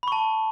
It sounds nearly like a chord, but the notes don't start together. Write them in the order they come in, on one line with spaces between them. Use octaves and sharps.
B5 C#6 A5